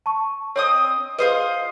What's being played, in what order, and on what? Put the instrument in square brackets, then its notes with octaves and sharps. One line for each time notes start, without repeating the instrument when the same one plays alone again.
[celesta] A5 C#6
[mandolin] C4 D#5 D#6 [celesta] C#5
[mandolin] F4 C5 D#5 [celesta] G#4 B4